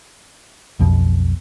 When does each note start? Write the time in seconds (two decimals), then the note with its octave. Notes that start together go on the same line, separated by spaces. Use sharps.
0.79 B1 F2 B2